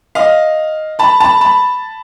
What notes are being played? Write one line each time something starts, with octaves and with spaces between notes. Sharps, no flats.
D#5 F5
A5 B5
A5 B5
A5 B5